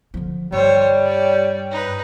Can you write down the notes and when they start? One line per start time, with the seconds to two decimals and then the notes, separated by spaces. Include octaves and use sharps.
0.14 D3 F3
0.52 G2 G3 C5 C#5
1.04 C#5 D5
1.71 D#4 B4